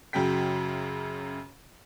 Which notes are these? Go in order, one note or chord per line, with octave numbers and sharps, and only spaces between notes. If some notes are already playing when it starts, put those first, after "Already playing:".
F#2 C#3 F#3 G5 B6